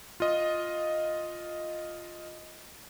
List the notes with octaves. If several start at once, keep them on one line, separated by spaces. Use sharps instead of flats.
F4 D#5